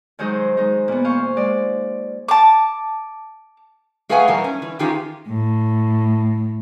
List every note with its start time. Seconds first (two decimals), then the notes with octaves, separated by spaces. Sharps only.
0.19 D#3 F#3 G#3 D#4 G#4 C5
0.57 G#3 D#4
0.88 A#2 B3
1.04 C5 F5 G#5 C#6
1.37 G#3 D5
2.28 A5 D6
4.09 A3 G#4 B4 F5 F#5 G#5
4.28 B2 E3 G3 A#4
4.44 C#4
4.62 E3
4.79 D#3 E3 C#4 F4 G4 G#4
5.28 A2